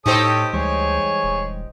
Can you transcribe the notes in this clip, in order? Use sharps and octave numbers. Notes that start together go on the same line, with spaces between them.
A2 D#4 G4 A4 C5 C#5 D#6
D2 E3 G3 G#3 G#4 C#5
D#1